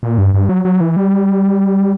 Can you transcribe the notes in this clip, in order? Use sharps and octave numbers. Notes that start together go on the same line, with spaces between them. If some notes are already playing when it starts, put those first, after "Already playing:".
A#2
G2
G2
F#3
F#3
E3
G3